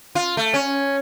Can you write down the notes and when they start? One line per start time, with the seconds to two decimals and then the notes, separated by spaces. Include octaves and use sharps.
0.15 F4
0.37 A3
0.54 C#4